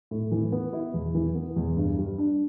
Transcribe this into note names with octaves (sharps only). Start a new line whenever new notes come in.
A2
E3
B3
E4
E2
E3
B3
E2
G2
G3
D4